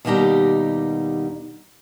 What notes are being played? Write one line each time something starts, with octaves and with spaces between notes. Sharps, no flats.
D#2 B2 G3 D#4 G4 A#5